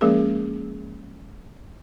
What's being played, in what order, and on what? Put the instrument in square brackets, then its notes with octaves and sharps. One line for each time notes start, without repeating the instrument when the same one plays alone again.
[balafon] F3 G#3 A#3 C#4 G#4 A#4